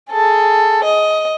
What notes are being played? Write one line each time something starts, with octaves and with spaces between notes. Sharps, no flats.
G#4 A4
D#5